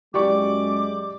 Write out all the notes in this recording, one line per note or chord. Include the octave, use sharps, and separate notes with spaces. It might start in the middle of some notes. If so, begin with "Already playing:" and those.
F#2 G#3 G4 D5 C#6 D6